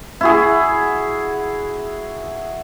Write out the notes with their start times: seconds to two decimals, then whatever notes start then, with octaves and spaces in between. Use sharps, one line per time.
0.21 E4 F#4 G#4